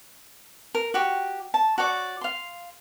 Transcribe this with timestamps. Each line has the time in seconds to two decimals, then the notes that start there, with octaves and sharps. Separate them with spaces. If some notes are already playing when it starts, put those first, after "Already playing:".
0.75 A#4
0.94 F#4 G4
1.54 A5
1.78 F#4 C#5 D5
2.21 F5 C6